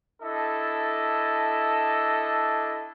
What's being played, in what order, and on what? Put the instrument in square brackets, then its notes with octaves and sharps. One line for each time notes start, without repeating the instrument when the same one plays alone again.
[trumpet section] D4 E4 A4 D#5 A5